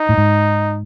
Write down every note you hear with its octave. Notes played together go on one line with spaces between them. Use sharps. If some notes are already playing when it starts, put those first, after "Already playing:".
Already playing: D#4
A2
G#2